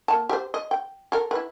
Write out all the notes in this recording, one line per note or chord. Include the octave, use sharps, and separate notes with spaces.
A#3 A5
G4 C5
D#5
G5
A4 A#4
E4 B4